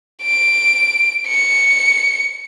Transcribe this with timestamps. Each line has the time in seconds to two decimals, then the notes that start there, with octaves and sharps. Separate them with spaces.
0.23 D7
1.27 C#7